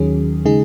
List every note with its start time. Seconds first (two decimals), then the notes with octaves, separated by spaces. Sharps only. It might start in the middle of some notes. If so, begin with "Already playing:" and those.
Already playing: D#2 D#3 F#3 C#4 G#4
0.45 C#3 G#3 D#4 G#4